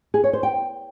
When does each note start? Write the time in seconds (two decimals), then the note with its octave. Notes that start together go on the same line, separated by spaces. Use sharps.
0.14 G#4
0.24 C#5
0.33 C5
0.43 G5